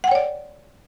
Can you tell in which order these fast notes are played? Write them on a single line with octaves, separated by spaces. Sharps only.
F#5 G5 C#5 D5